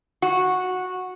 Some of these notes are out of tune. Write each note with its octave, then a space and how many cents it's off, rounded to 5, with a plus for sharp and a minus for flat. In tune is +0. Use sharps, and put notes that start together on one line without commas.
F#4 -10